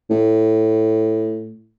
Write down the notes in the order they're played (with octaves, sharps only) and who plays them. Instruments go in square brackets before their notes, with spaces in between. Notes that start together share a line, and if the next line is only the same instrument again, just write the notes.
[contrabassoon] A2